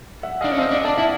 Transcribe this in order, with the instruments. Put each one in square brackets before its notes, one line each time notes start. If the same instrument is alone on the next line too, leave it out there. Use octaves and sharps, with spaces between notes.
[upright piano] E5 F#5
[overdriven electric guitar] D4 [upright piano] D#5 F5
[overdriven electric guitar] C#4
[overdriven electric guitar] C4 [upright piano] D#5 F5
[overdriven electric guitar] D4
[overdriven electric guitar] D4 [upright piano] D5 E5
[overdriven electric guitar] E4